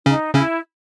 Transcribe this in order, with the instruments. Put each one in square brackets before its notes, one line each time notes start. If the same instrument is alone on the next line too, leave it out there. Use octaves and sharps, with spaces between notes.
[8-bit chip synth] C#3 C#4 [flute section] D#4
[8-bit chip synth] C#3 C#4 [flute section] E4